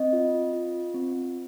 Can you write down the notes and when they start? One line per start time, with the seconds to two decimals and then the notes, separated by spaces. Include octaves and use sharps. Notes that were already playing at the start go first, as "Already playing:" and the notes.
Already playing: C4 D#5
0.13 F4
0.53 F4
0.94 C4